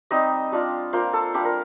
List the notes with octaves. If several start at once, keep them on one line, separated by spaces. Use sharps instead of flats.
G3 C4 D#4 D#5
G3 D4 F4
A#3 F4 C5
A4
G3 D4 F4 C5
A#4